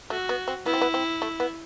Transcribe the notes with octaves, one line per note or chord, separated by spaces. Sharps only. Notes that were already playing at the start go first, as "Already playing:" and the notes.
A3 F#4
B3
C4
B3 E4
C4
B3
C4
A3
B3